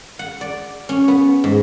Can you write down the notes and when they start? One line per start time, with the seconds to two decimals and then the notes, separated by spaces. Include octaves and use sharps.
0.19 F#5
0.41 D5
0.89 C#4
1.08 B3
1.44 G#2